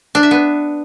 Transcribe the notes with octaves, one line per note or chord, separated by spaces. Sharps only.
D4
E5
B3